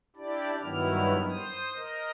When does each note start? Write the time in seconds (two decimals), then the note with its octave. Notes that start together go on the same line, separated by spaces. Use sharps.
0.16 D4 E4 G4 D5
0.62 G2 D#3 F#3 B3 E4 F6
1.30 C5 D#6
1.76 A#4 D#5